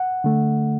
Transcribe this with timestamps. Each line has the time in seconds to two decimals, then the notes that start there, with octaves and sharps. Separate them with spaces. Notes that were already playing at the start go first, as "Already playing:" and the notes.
Already playing: F#5
0.24 D3 A3